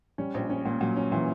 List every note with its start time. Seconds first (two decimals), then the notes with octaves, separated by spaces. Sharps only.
0.18 G3 C#4
0.34 A#1
0.50 C#4
0.65 A#2
0.81 A#2 F#3
0.96 C#4
1.12 A#2 E3